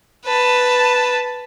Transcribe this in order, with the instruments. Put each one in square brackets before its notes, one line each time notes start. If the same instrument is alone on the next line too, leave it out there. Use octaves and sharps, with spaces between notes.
[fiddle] B4 A5